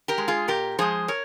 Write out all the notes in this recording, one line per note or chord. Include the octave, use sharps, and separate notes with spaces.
G4 A#4
G#3
F4 G#4
A#2 G4 A#4
F3 G#3 G#4 C5
A#4 C#5